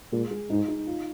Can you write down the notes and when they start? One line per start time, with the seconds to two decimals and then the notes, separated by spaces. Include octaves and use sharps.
0.12 A#2 G#3
0.31 G#3
0.50 G#2 D#4
0.68 D#4
0.87 F4